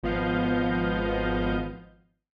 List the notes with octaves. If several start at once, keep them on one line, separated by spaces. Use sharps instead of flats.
G#1 F3 B3 D#5 F5 G6